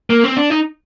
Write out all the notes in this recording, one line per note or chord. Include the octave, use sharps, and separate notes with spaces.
A#3
C4
D4
D#4